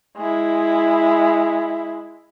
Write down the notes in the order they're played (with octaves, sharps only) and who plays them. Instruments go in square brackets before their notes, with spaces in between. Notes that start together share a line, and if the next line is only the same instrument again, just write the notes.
[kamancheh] G#3 E4